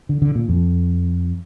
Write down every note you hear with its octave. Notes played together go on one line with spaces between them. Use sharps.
D3
D3
A#2
F2